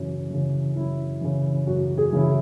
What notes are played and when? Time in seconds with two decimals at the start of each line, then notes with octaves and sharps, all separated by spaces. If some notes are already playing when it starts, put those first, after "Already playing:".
Already playing: F#2 C#3 E3
0.31 C#3 E3
0.76 F#2 E4
1.21 C#3 E3
1.67 F#2 F#4
1.98 G#4
2.13 C#3 E3 E4